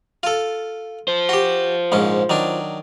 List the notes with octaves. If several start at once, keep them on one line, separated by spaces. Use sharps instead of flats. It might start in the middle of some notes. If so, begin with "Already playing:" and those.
F4 A4
F4 C5
F#4 G4
A#1 G#2 C#4
D#3 F#3 D4